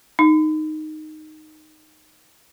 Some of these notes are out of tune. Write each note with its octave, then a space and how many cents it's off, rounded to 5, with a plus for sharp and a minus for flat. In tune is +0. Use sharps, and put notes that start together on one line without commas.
D#4 -5